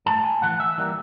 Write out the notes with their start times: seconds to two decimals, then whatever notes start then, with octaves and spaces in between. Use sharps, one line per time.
0.06 A2 E3 A3 A5
0.24 G#5
0.41 A2 E3 A3 F#5
0.60 E5
0.78 E3 G3 A#3